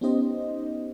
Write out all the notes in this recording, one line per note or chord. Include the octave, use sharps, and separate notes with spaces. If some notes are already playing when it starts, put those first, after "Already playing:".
B3 C#4 D#4 G4 C5 D#5